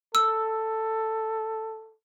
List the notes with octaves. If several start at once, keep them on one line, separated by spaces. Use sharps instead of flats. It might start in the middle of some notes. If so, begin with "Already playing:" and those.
A4 E6